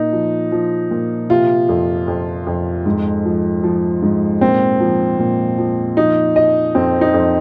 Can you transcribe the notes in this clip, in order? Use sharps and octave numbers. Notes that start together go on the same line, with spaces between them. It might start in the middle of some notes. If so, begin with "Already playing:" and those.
Already playing: A#2 D#4
F3
F3
A#2
C3 F4
F2
F2
F2
G#2
F3
F3
G#2
A#2 C4
F3
A#2
F3
F3 D#4
F3 D#5
F2 C4
D#4
F2